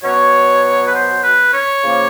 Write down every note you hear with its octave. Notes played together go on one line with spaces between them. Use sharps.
B2 F#3 B3 C#5
B4
C5
B4
C#5
C#3 F3 A#3